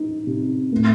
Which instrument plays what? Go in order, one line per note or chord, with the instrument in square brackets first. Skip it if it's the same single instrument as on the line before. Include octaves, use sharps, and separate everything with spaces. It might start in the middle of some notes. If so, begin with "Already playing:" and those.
Already playing: [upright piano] D#4
C3
A2